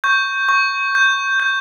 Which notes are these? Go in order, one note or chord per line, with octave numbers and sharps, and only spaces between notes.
C#6 G6
C#6
G6
G6